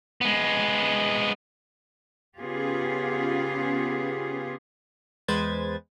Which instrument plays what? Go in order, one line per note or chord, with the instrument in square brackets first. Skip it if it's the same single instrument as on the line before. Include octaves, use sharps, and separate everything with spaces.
[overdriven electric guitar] G#3 B3
[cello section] C#3 B3 C#4 F4 G4 G#4
[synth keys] E2 G#3 B4 C5 G#6 A6